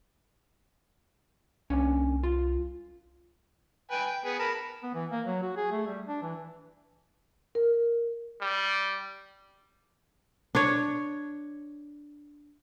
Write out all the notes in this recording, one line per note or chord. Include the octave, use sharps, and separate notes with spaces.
C2 A#3 C#4 D4
F4
B4 G5 G#5
G5
B3 G#4 B4
A#4 A5 B5
B3
E3
A#3
F#3
F#4
G#4
A3
G3
D4
E3
A#4
G3
D4 C#5